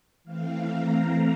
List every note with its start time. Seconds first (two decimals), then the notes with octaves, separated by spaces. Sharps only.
0.24 E3 A3 C4 F5
0.67 A#5